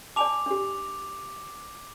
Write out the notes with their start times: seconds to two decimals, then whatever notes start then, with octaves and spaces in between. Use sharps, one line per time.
0.16 D5 G#5 A5 D6 F7
0.46 D4 G4